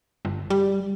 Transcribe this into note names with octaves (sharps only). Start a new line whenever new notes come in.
G1
G3